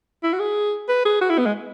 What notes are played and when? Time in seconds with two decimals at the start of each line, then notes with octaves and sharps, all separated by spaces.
0.23 E4
0.33 F#4
0.40 G#4
0.89 B4
1.05 G#4
1.21 F#4
1.30 E4
1.38 B3
1.46 G#3